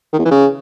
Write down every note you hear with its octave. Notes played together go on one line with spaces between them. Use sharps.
D#3
E2
E3
C#3